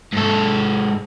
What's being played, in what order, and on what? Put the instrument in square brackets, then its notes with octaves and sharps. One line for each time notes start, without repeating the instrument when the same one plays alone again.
[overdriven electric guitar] G#2 A4